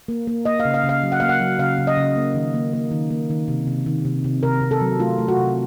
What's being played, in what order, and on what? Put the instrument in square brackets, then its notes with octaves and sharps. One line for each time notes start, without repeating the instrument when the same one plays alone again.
[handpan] A#3
A#3
A#3 D#5
F5
C#3
F5
C#3
F5
F#3
F#5
A#3 F5
F#5
F#3
C#3 F5
C#3
D#5
C#3
A#3
D#3
A#3
A#3
D#3
A#3
D#3
C3
C3
D#3
C3
C3
C3 A#4
C3
A4
F#3
A3 F4
A3
F#4
C3